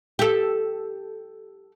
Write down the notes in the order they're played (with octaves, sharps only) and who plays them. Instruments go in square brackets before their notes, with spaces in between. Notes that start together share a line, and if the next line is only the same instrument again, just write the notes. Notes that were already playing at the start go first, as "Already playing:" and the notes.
[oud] G4 A4